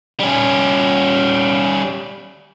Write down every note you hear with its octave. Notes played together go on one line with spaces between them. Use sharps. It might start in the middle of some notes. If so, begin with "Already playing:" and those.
G3 C#4